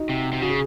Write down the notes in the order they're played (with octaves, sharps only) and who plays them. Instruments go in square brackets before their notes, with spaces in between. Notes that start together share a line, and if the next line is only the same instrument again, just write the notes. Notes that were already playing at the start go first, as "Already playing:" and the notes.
Already playing: [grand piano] D#4 F#4
[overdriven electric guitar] C3
C3
[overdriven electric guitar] C#3 [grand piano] F#4
[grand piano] G#4